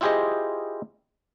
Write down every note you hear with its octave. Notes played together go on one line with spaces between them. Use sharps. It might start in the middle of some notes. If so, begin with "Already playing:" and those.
E4 F4 G4 G#4 C5 D#5